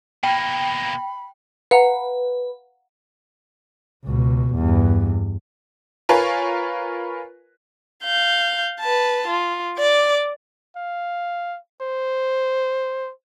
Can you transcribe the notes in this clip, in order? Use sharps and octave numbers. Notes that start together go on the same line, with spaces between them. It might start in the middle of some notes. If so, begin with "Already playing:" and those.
B2 A#3 G5 B5
B4 F5 F#5 A#5
C#2 B2
E2 G2
F4 A#4 B4 C#5 G#5
F5 G6
B4 A5
F4
D5 D6
F5
C5